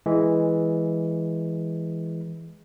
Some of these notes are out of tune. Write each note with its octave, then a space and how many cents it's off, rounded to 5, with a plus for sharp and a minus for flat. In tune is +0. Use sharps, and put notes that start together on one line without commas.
E3 +0 G#3 +0